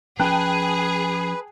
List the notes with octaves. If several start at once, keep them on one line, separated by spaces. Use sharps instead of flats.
F3 C#4 G#4 B4 G5 A5 F#6